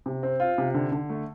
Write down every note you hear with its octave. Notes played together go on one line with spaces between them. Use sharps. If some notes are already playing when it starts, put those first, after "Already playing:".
C3
C4
F4
C3
D3
D3
A3